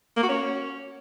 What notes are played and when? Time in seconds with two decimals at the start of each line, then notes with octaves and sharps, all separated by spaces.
0.17 A#3
0.23 F#4
0.29 C#4